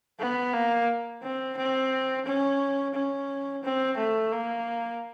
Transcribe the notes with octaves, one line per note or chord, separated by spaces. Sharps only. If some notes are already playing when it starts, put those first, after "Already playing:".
B3
A#3
C4
C4
C#4
C#4
C4
A3
A#3